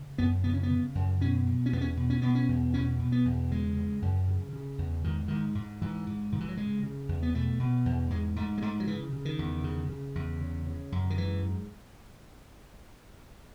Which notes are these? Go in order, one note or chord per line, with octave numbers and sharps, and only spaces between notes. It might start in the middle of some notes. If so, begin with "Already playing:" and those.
Already playing: C#3
F#2 B3
C#3 B3
C#4
B3
C#3
F#2
B2 C#4
B2
C#4
E2 B3
C#4
B2
C#4
B2 B3
C#4
E2
B2 C#4
B2
B3
E2
C#3 G#3
C#3
F#2
C#3
C#3
E2
G#2 D#3
G#2 D#3
G#2
G#2 E3
G#2
G#2 D#3
E3
F#3
C#3 G#3
C#3
E2
B3
B2 A3
B2
E2
G#2 G#3
G#2 A3
G#3
G#2 A3
F#3
C#3 E3
C#3
D#3
E2
C#3
C#3
E2
C#3
C#3
F#2
D#3
G#2 E3
G#2